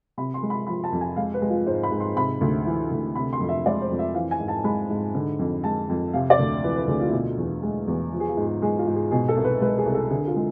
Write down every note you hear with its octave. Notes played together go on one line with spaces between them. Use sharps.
C3 B5
C6
G#3
B5
F3 B5
A5
F2
G#5
G#3 F5
B4
G#3
F4
G#2 C5
B5
G#2
C6
C3 B5
D2
E3
D2
C3 B5
C6
F2
E5
G#3 D5
C5
F2
E5
E3 F5
G#5
G#2
A5
G#3 B5
G#2
D3
F2
G#3 A5
F2
C3 F5
D5
D2
E3 B4
B4
D2 G#4
F4
E4
B2 F4
E2
G#3
E2
F3
G#4
F4
G#2
G#4
G#3 G#4
F4
G#2
G#4
B2 G#4
A4
C2
B4
G#3 B4
G#4
C2
A4
D3 G#4
F4
G#3